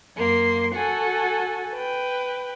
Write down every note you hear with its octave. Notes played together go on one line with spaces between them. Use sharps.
F#2 A#3 C6
F#4 A4 G#5
B4 G5